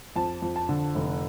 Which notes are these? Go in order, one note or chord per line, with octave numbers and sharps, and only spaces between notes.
F2 A5
F2
A5
D3
F1